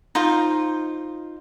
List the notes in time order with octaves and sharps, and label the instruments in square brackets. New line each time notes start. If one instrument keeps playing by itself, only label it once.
[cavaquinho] D#4 F4 C5